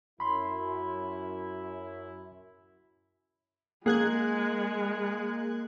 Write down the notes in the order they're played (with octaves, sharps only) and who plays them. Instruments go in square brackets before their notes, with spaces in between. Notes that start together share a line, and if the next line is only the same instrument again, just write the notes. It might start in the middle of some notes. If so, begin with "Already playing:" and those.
[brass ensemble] F#2 E4 [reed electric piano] B5 C6
[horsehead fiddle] G#3 [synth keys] A#3 F#6 G#6 [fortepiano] G#4